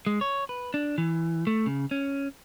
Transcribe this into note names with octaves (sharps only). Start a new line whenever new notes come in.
G#3
C#5
B4
D4
E3
A3
C#3
C#4